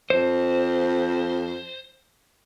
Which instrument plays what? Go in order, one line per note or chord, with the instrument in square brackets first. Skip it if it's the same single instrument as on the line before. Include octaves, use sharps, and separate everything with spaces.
[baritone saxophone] F2 [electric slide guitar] C5